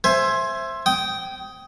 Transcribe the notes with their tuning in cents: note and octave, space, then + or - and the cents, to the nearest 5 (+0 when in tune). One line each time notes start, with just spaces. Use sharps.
C5 +15 E5 +15 G#5 +10
G5 -10 D#6 +15